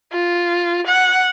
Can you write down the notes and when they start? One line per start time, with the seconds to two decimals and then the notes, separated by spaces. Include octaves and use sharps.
0.12 F4
0.87 F#5